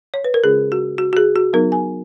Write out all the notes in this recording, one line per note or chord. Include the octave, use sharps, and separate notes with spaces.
C#5
B4
A#4
C#3 G#3 C#4 F4 G#4
F#4
F#4
F#4
G#4
F#4
F#3 B3 D#4 A#4
G#5